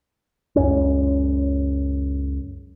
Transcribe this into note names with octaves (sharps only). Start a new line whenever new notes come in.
C#2 F#2 C#4